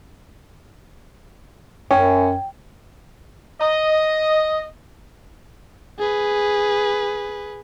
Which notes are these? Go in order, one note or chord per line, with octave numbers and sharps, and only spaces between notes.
F#2 C#4 G5
D#5
G#4 B4